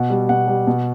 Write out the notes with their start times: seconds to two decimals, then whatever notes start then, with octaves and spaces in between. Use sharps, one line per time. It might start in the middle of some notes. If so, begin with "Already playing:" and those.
Already playing: B2 F#5
0.10 G3
0.29 B2 F#5
0.48 G3
0.67 B2